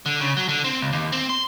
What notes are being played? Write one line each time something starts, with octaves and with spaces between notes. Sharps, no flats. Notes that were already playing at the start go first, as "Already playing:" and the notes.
D3
C#3
F#3
D3
C4
C#2
D#2
C4
C6